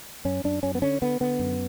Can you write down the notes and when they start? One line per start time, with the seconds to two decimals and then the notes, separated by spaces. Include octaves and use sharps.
0.25 F#2 C#4
0.44 F#2 D4
0.63 F#2 C#4
0.75 B3
0.82 D3 C#4
1.02 D3 B3
1.20 D3 B3
1.39 F#2